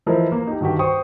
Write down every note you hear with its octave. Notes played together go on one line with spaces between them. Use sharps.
E3 F3 E4 A#4 C5 D#5
A#3
D#4 G4
G2 D#3 F#4 G4
C5 G5 C#6 D#6